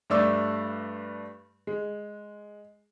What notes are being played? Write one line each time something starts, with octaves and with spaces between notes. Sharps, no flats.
G2 G3 A3 D5 E6
G#3